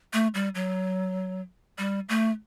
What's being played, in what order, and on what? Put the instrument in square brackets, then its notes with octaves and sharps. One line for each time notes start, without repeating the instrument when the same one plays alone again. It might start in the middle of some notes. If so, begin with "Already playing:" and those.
[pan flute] A3
G3
F#3
G3
A3